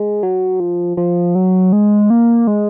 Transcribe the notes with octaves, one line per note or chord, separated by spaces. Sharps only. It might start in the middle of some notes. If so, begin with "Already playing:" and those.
Already playing: G#3
F#3
F3
F3
F#3
G#3
A#3
G#3